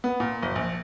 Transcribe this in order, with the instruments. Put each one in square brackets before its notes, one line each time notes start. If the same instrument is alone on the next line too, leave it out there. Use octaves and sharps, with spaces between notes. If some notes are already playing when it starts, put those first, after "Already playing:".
[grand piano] B3
A#2
F#1
A#1